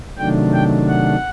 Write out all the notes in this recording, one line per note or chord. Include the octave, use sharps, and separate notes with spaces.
C3 D#3 F#3 A3 D4 G5
G5
F#5